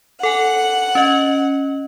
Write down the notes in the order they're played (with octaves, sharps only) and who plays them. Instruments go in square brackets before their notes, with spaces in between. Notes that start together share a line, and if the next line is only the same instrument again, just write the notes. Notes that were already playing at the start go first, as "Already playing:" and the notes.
[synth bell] A4 G#5 [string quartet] F#5
[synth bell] C#4 D#5